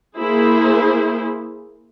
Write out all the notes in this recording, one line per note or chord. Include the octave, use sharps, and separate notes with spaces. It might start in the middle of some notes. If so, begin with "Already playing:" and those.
A#3 E4 G#4 C5